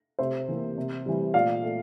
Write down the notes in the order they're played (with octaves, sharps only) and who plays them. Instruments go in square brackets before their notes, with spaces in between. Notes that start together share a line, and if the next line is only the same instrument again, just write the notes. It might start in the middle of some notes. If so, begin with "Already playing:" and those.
[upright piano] C3 C5 E5
E3 A#3
C3
E3 G3
A#2 D5 F5
A3